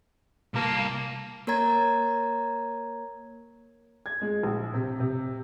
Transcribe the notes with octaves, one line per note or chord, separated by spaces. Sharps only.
C2 A#3 A5
A#3 A#4 C#5 A#5 G#6 A6
G#6
G#3
A#1
C3
C3